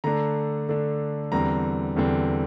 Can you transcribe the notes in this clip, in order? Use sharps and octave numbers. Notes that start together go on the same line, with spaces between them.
D3 A3 D4 A#5
D3 A3 D4
E2 D3 G3 C4 A#5
E2 D3 G3 C4